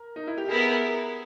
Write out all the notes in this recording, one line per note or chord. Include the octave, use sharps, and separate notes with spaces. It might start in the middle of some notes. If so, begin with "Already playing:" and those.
Already playing: A#4
D#4
E4
G4
B3 E4 G#4 A#4